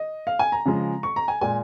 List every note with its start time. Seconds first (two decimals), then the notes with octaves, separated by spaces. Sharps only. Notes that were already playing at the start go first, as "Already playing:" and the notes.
Already playing: D#5
0.27 F5
0.39 G#5
0.52 A#5
0.66 C#3 F3 G#3
1.03 C#6
1.16 A#5
1.28 G#5
1.41 A#2 G#3 G#5